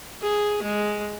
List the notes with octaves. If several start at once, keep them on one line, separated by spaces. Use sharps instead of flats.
G#4
G#3